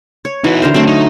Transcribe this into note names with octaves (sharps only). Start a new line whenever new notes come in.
C#5
E3 D#4 F#4
D3 A#4 C5
F#3 A3 C4
D#4